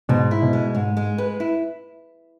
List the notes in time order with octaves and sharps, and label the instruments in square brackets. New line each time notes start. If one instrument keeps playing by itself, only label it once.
[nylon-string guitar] G#2 [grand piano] B2
[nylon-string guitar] E4
[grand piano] B2
[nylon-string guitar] G#3
G#2
G#3
B4
E4